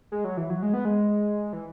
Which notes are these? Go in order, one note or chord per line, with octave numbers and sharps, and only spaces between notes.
G#3
F#3
E3
F#3
G#3
B3
G#3
E3